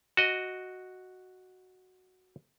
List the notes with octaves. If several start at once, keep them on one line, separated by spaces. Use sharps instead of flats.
F#4 D#5